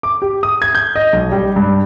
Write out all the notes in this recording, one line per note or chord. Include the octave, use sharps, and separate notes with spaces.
D6
G4
D#6
G#6
G6
D#5
B1
G3
G2